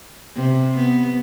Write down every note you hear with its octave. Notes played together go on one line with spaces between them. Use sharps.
C3
B3